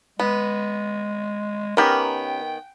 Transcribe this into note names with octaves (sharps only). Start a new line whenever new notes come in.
G#3 B3
D#3 B3 C#4 G4 A#4 G5